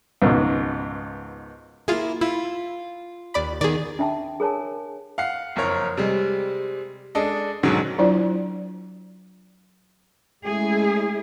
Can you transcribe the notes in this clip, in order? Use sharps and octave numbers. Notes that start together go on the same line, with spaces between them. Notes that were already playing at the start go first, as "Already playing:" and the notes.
C#2 G#2 B2 D#3
A#3 E4 F4 G#4
E4 F4
D#2 D5 B5
D#3 B3 G#4 D5
D4 E5 G5 A5
G#4 A#4 C#5 G#5 A5
F5 F#5 C7
F#1 F2 A#4 C#5
C3 G3 G#3
G#3 D4 A4 D#5
G#2 B2 D3 D#3 F#3 G#3
F#3 D4 E4 F4 C5 D5
G#3 A3 C#4 E4 G#4